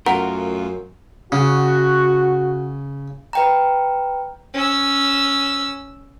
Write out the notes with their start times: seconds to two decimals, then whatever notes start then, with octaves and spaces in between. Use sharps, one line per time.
0.06 F#2 A3 F4 A#4 F#5
1.32 C#3 F#4
3.33 B4 G5 A#5
4.54 C#4 E6